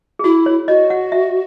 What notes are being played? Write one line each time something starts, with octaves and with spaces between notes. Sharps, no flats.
G#4
E4 F#4
C#5
F#4 D#5
F#5
E5